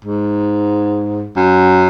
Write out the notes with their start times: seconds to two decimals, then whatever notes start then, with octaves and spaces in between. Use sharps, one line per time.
0.05 G#2
1.36 F#2